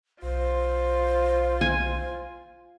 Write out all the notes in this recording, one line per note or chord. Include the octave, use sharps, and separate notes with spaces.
B1 F4 C5
G#5